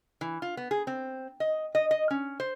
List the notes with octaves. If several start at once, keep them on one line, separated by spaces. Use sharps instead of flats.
E3
F4
B3
G#4
C4
D#5
D#5
D#5
C#4
C5